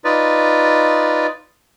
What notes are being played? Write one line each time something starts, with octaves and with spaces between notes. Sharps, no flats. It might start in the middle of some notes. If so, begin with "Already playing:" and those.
D#4 F4 B4 D5